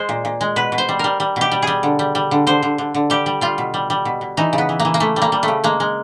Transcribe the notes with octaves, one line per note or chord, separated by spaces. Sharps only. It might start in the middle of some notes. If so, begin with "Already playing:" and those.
Already playing: G#3 C5
A#2
A#2
G#3
B2 B4
B2
C5
G3
G3 A#4
G3
B2 G4
G3
G3 G#4
D3
G3
G3
D3
D3 C5
D3
D3
D3
G3 G4
G3
G3 F4
B2
G3
G3
B2
B2
E3 D#4
C#3
B3
E3
A#3
E3
A#3
E3 A3
G3
A#3
G3
A3
C#3
G#3 A#3
G#3